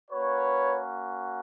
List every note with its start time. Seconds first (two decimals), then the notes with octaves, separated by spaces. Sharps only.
0.11 A#3 C#4 F#4 B4 C#5